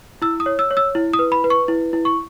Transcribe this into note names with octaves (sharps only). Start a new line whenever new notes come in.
E4 E6
D#6
C#5
E6
C#5
E6
E4
D#6
B4
B5
B4
C#6
E4
E4
C#6